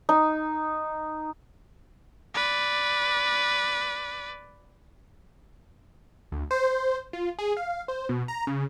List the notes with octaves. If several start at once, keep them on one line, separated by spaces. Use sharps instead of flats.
D#4
B4 D5
D2
C5
C5
F4
G#4
F5
C5
B2
A#5
C#3